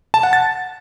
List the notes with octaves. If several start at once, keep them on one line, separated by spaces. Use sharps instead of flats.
A5
F#5
A6